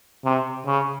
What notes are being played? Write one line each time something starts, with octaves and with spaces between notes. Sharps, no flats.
C3
C#3